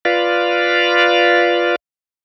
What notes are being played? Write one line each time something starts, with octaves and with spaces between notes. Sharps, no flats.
F4 B4 D5 F5